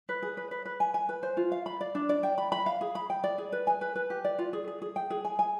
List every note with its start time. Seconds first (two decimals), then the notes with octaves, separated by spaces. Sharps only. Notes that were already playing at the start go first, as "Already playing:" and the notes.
0.09 B4
0.22 G#4
0.37 B4
0.51 B4
0.65 B4
0.80 G#5
0.94 G#5
1.09 B4
1.23 C5
1.37 F4
1.52 F5
1.66 B5
1.81 D5
1.95 D4
2.09 D5
2.23 G5
2.38 B5
2.52 B5
2.66 F5
2.81 G#4
2.95 B5
3.10 G5
3.24 D5
3.38 G#4
3.52 B4
3.67 G#5
3.81 B4
3.96 B4
4.10 G4
4.25 D5
4.39 F4
4.53 G#4
4.68 G#4
4.82 G#4
4.96 G5
5.10 G#4
5.25 G#5
5.39 G#5